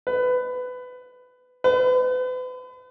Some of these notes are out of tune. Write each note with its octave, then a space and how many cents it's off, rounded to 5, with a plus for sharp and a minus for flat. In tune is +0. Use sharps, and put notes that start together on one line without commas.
B4 +20
B4 +40